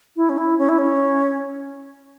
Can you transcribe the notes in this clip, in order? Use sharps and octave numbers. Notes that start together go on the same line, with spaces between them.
E4
C#4
E4
C#4
E4
C#4